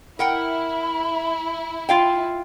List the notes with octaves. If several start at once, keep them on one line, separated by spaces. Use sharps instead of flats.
E4 A#4 F#5 G5 B5
F4 F5 G5